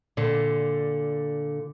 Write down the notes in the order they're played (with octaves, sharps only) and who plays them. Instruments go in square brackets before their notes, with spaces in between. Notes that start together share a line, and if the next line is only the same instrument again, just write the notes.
[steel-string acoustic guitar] A#2 D3